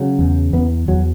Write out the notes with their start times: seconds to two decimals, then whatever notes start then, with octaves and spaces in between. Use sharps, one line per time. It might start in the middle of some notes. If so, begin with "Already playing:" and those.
Already playing: C#3 F#3
0.19 E2
0.53 E2 B3
0.88 E2 F#3